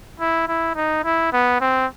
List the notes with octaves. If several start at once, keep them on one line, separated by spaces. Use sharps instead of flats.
E4
E4
D#4
E4
B3
C4